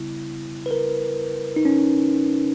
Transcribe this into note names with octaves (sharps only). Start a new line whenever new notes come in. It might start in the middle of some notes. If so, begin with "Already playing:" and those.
Already playing: C#3 G3 B3 E4
B4
A#4
D#4
C#4